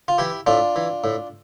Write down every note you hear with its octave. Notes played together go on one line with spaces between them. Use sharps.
F4
E3 E4 G4
A2 D4 F4
E3
A2